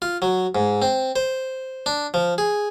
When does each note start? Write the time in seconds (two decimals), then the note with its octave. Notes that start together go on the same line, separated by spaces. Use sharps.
0.02 F4
0.22 F#3
0.55 G#2
0.82 C4
1.16 C5
1.86 D4
2.14 F3
2.38 G#4